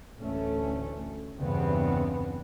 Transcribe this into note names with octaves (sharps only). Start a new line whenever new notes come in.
A1 D2 A3 C#4
E2 G2 C#3 B3 C4